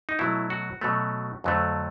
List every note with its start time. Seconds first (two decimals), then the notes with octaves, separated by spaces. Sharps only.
0.09 D#4
0.19 B2 F#3 A3 E4
0.50 F#4
0.81 B2 F#3 A3
1.44 F2 D3 F#3 A3